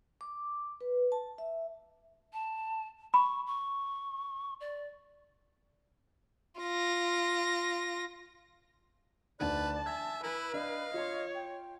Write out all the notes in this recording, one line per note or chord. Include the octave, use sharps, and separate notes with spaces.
D6
B4
A5
E5
A5
B5 C#6
C#6
D5
F4 A#6
D2 D3 D#4 B4 D5 A5
E5 G#5 G#6
E4 B4
D4 D#5 F5
F4 C#5 C6
G5